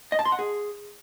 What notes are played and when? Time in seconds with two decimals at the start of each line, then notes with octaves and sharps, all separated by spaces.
0.12 D#5
0.19 A5
0.25 C6
0.32 F#5
0.39 G#4